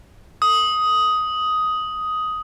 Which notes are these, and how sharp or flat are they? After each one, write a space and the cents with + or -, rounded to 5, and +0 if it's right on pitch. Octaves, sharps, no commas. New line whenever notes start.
D#6 +10